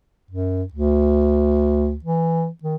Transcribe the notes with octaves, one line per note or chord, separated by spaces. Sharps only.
F#2
D2
E3
D#3